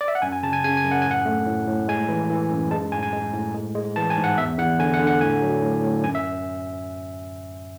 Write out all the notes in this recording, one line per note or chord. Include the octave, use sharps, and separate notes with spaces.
D5
E5
F#5
F#2 G#5
G#5
C#3 A5
G#5
C#3 G#5
G#5
F#2
F#5
A2 G#5
F#5
A3
A2
A2
G#3 G#5
E3
E3
F#2
G#3 A5
A2 G#5
G#5
G#3
A2
G#3
G#3
E3 A5
G#5
G#2
F#5
E2 E5
E2 F#5
D3 G#5
F#5
D3
F#5
A2 G#5
F#3
A2
A2
F#2 G#5
E5